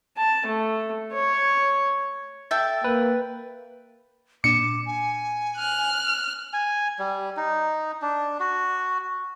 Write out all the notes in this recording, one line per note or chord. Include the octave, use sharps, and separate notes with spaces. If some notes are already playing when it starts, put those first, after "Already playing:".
A5
A3
C#5
A4 E5 G5 G6 A6
A#3 B4
A#2 D4 D6 C#7 E7
G#5
F6 F#6
G#5
G3
D#4
D4
F#4